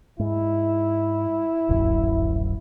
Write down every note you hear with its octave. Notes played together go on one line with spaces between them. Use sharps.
G#2 E4
D1 A#1 F#2